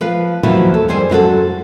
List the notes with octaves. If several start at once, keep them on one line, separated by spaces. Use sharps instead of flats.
F3 B4 F5
D#2 F3 F#3 E4 F#4 B4
A4
F#2 G3 G#4 C5 G#5
F#2 E4 F#4 A4